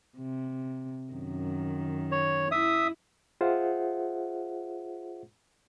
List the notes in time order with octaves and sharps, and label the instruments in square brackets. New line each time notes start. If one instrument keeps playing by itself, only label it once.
[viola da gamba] C3
F#2 D#3
[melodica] C#5
[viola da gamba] E4 [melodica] E5 D#6
[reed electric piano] F4 G#4 C5 E5 F#5